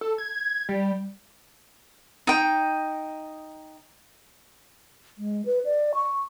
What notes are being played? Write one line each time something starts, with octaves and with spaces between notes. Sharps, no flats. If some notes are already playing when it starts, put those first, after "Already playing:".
A4
G#6
G3
D#4 G5
G#3
B4
D5
C#6